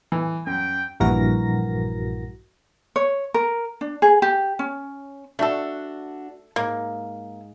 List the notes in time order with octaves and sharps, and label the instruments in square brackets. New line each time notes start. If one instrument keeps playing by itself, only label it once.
[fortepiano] E3
[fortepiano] F#2 [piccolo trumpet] G5
[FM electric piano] A#1 G2 E3 F#4 A#4 A#6
[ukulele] C#5
A#4
D4
G#4
G4
C#4
[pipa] A3 A4 [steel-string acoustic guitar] D4 F#4
[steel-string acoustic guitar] G#2 [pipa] A#3